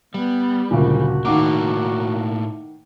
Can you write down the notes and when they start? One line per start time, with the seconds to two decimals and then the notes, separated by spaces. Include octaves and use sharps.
0.14 G3 B3
0.71 F#1 D2 A#2 F#4
1.25 A2 D#3 A#3 F#5 D6